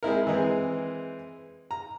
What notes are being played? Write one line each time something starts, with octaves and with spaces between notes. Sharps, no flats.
G#3 C4 E4 A#4
E3 G#3 C4
A#5